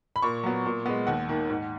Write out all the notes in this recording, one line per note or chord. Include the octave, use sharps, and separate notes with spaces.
B5
A#2 C#6
F#3 B3
A#2
G#3 B3
D#2 F#5
D#3 A#3
G#2